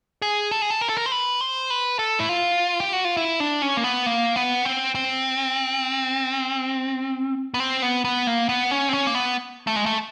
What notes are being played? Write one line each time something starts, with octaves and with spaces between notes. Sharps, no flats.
G#4
A4
G#4
A4
A#4
A4
A#4
C5
B4
C5
B4
A4
E4
F4
G4
F#4
F4
E4
D4
C#4
A#3
B3
A#3
B3
C4
C4
B3
C4
B3
B3
A#3
B3
C#4
C4
C#4
A#3
B3
A3
G#3
A3